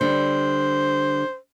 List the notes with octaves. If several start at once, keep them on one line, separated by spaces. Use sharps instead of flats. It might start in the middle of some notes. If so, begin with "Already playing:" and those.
D3 G3 C5